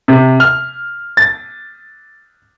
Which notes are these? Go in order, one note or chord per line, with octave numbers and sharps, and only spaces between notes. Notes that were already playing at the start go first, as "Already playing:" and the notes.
C3
F6
A6